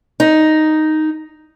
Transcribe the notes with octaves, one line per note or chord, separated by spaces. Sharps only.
D#4